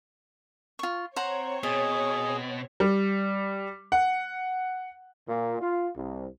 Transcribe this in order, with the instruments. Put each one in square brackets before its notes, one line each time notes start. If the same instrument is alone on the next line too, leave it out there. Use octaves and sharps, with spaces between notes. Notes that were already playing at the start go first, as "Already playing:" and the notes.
[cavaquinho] F4 C#6
[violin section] C4 C#5 [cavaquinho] C5 F#5 A#5
[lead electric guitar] B2 [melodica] G#4 [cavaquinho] D#5
[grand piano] G3
F#5
[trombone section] A#2
F4
C2